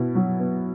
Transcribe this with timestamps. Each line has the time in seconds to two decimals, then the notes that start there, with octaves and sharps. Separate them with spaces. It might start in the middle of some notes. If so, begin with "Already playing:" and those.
Already playing: B2 E4
0.15 F#3
0.40 B3